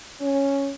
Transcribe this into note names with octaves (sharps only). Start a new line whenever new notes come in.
C#4